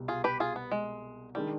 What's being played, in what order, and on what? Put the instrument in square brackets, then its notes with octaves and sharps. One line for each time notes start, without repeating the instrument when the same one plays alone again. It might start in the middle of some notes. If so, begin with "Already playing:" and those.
Already playing: [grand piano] C2 B2 G3
[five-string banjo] F4 G#4
G4 B4
F4 G#4
B3
G#3
[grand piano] D#3 G#3 D4 [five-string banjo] G3